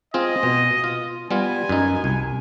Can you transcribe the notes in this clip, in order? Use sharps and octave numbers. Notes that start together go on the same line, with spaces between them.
C4 F4 G#4 D#5
B2
F4
G3 B3 F4 G#5
F#2 D#4
C2